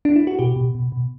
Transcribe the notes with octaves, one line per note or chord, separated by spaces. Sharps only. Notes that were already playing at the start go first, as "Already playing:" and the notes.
D4
E4
F#4
B2 G4
B2
B2
B2